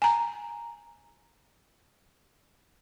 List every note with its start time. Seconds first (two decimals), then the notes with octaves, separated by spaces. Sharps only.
0.02 G#5 A#5